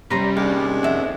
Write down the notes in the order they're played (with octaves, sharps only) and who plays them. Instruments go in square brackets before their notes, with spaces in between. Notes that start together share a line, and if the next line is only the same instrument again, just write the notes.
[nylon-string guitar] C3 C#4 [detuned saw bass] G3 [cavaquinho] B4 A#5 C6
[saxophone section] D#2 G#3 D4 [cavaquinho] F5
[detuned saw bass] F2 [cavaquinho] E5 F#5